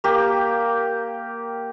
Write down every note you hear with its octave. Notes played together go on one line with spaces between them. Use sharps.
A#3 G4